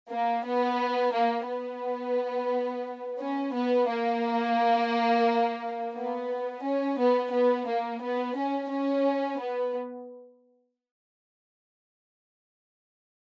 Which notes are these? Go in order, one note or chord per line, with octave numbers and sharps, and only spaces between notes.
A#3
B3
A#3
B3
C#4
B3
A#3
B3
C#4
B3
B3
A#3
B3
C#4
C#4
B3